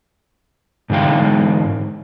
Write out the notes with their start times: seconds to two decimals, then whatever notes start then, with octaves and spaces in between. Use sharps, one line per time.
0.90 G#2 D3 G#3 F5 G5